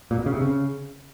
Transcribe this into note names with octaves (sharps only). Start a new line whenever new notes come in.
A#2
B2
C#3
C3
C#3